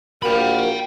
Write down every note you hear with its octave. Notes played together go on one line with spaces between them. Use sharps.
A#1 A#3 F#4 A#4 G5 B5